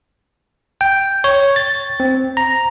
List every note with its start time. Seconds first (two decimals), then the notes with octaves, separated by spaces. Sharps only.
0.81 G5
1.24 C#5
1.56 A6
2.00 C4
2.37 A#5